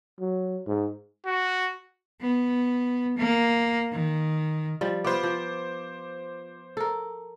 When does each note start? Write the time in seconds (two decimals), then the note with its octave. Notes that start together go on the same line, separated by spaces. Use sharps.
0.20 F#3
0.67 G#2
1.26 F#4
2.21 B3
3.17 A#3
3.92 D#3
4.81 F3 G3
5.04 B3 F4 B4 C5 D6
5.23 F3
6.77 A4 A#4